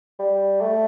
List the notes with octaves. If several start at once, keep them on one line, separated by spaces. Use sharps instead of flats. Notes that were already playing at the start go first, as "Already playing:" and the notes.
G3
A3